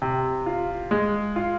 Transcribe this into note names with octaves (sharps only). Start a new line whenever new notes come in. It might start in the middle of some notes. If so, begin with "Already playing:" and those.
C3
F4
G#3
F4